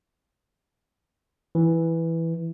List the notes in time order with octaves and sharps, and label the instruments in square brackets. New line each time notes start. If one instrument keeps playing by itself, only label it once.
[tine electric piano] E3